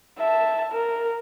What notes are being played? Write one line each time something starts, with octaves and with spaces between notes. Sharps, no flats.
E5 A5
A#4